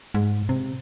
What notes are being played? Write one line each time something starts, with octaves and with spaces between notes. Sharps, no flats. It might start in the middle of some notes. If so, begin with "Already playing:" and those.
G#2
C3